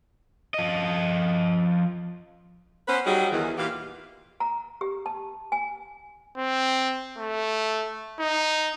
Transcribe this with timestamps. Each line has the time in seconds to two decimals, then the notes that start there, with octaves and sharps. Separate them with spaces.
0.54 F3 D#5
2.88 B3 C#4 B4 C5
3.05 F#3 G3 C#4 D#4 F#4 G#4
3.31 E2 D#3 E3
3.58 A#2 E3 G4 F5
4.40 A#5
4.81 G4
5.06 A5
5.52 G#5
6.37 C4
7.18 A3
8.20 D#4